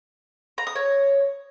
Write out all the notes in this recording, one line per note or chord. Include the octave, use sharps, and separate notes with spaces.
A#5
D#6
C#5